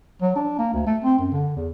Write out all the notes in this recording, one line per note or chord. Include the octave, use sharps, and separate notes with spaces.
F#3
D4
A#3
D2
A3
C4
F#2
D3
E2